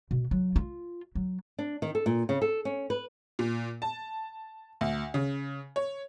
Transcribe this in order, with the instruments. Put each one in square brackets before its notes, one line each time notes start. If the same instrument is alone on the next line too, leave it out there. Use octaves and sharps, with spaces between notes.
[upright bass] B2
F#3
F4
F#3
[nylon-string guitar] D4
D#3
A4
A#2
C#3
A4
C#4
B4
[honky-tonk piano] A#2
A5
D2
C#3
C#5